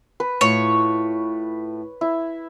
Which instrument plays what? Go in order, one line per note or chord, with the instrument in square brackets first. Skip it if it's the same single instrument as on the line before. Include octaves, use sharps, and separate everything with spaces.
[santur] B4
[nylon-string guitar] A2 F4 [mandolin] C#5
[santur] E4